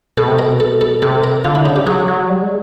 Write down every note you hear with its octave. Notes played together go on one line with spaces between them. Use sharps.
B2 A4
C3
B2 A#4
A4
A4
C3 A4
A#4
D3 F4
E4
C#3 D#4
G4
F#3 G#4
F#3
G3
G#3